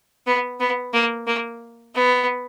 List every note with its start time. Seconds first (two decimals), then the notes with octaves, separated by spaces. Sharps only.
0.27 B3
0.60 B3
0.93 A#3
1.27 A#3
1.95 B3